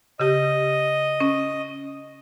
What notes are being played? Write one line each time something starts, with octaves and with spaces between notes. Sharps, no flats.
C#3 G4 D#5
C#4